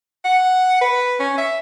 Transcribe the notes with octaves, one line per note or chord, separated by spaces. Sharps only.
F#5
B4
C#4
E5